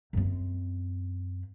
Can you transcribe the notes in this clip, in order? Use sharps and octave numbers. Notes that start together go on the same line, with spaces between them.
F#2 C4